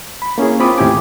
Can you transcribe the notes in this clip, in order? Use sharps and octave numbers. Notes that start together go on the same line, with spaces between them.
B5
A#3 C#4 E4 G#4
C4 F4 B5 D6 D#6
D#2 A2 E4 G4 G#5 D6